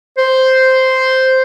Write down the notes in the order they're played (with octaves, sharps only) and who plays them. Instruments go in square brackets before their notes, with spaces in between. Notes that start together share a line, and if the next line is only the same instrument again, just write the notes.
[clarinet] C5